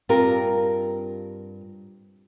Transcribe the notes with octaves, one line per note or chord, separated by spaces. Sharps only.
G2 C4 F4 G4 A#4